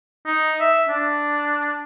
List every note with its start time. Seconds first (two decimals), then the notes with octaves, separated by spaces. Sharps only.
0.26 D#4
0.60 E5
0.89 D4